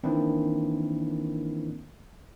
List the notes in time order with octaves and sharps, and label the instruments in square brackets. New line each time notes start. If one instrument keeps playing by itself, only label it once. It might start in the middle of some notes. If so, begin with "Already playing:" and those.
[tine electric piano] D#3 E3 A#3 C4 D4 E4